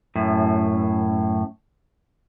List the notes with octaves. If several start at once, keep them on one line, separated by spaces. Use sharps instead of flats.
F#2 A2